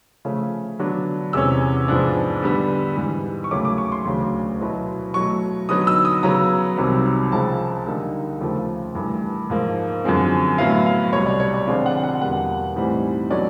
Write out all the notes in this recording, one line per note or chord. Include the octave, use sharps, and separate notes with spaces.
C#3 F3 A3 C#4
D3 F#3 B3 D4
E2 C3 E3 G#3 C#4 E6
G#2 F3 G#3 B3 D4
D3 G3 B3
G#2 E3 G3
C#6
D#2 C#3 F#3 A3 C#4 D6
D6
C#6
C6
D2 C#3 F#3
B2 F#3 B3 E4
B2 F#3 A3 C#6
D3 F#3 B3 D#4 D#6
E6
D#6
C#3 F#3 B3 A#5
C2 C3 D#3 F#3
C#2 C#3 F3 G#3 A5
D3 G3 A#3 D#4
D#2 C#3 F3 A3
G2 E3 A3
G#2 F3 A#3
F#2 D3 F3 G#3 C4
A2 F#3 B3 E4 F5
F5
C2 B2 G3 C#5
D5
C#5
D5
D3 F3 G#3 C4 F4 D5
F#5
F#5
E2 B2 G3 A#3 F#5
A2 E3 G3 C4 D#4
B2 F#3 A3 C#4 D5